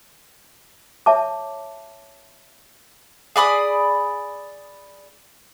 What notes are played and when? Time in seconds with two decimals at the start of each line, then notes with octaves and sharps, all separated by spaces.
1.06 C#5 E5 A5 D6
3.36 G#4 D5 B5 D#6